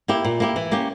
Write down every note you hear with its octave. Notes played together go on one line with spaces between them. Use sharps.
A#3 E4 G4
A#2
A#3 E4 G4
E3
A#3 C#4 G4